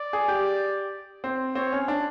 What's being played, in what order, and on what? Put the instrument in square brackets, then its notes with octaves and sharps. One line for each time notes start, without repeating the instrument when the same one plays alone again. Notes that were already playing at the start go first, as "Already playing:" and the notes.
Already playing: [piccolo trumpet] D5
[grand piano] G#4
G4
C4
[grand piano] C4 [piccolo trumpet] C#5
[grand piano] C#4
D4